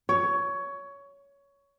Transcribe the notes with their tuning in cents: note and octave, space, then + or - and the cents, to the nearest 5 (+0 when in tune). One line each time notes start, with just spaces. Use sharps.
C#5 +15